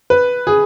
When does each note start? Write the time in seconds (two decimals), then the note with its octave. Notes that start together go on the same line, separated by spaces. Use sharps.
0.10 B4
0.47 G#4